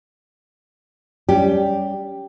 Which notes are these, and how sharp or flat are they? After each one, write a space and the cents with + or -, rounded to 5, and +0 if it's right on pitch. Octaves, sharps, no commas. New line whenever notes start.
G3 +5 C#4 +25 G4 +0